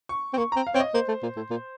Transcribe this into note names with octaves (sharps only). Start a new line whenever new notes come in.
C#6
C4
A#3 C#6
C4 A#5
F5
C4 C#5
D#5
A#3 C5
A3
A#2
A2
A#2